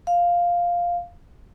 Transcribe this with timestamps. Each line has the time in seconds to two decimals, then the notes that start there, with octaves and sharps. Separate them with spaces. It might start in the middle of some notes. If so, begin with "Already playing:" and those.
0.07 F5